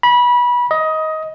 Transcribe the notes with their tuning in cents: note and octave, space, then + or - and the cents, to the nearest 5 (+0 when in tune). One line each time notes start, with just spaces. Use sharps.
B5 -25
D#5 +15